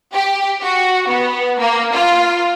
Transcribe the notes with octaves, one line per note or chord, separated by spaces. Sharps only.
G4
F#4
B3
A#3
F4